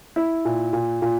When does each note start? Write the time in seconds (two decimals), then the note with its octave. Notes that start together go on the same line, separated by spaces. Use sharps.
0.16 E4
0.45 A#2
0.73 A#2
1.02 A#2